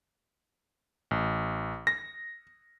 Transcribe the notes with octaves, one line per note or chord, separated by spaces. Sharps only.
A1
A#6